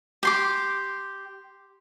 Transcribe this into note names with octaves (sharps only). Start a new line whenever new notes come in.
G4 C6 D6